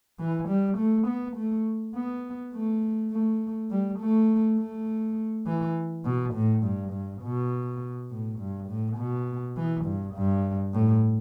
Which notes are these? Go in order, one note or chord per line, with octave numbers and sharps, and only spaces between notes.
E3
G3
A3
B3
A3
B3
A3
A3
G3
A3
A3
E3
B2
A2
G2
G2
B2
A2
G2
A2
B2
E3
G2
G2
A2